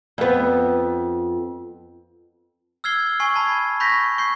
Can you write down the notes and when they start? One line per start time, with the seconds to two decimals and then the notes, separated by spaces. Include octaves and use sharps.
0.18 F2 B3
2.84 E6 F6 G#6 C7 G7
3.20 G#5 C#6 C7
3.36 A5 B5 G#6
3.80 B5 C#6 G6 A#6 B6
4.18 C#6 G6 C7